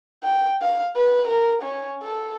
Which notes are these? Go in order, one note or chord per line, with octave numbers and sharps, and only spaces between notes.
G5
F5
B4
A#4
C#4
A4